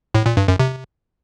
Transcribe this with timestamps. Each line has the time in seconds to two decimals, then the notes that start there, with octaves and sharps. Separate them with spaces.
0.15 A2
0.26 A#2
0.37 G2
0.48 F#2
0.59 C3